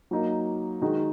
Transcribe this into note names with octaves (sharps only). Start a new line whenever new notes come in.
F#3 A#3 D#4
D#3 G#3 D#4 F#4